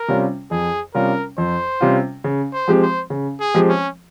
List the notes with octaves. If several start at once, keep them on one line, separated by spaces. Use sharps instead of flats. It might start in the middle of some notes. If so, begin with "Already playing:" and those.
Already playing: A#4
C3 G3 C#4 F4
F2 G#4
C3 G3 C#4 F4 A#4
F2 C5
C3 G3 C#4 F4
C#3
C5
F3 G#3 C4 G4
C5
C#3
G#4
F3 G#3 C4 G4
C#4